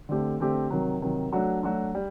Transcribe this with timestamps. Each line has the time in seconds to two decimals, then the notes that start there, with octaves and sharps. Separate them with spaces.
0.09 D3 A3 C4 G4
0.40 D3 A3 C4 G4
0.71 C3 D#3 F#3
1.02 C3 D#3 F#3
1.32 F#3 A3 D4 F#4
1.63 F#3 A3 D4 F#4
1.95 G3